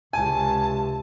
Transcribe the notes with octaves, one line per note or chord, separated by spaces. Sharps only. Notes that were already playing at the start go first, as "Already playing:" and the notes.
C#2 C3 G#5 A5